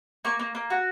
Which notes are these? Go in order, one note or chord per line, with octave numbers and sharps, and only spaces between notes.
A#3 C#6
A#3
A#3
F#4